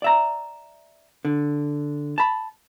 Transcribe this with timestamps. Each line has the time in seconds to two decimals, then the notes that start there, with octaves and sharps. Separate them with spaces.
0.02 D5 E5 A#5
1.25 D3
2.18 A5 B5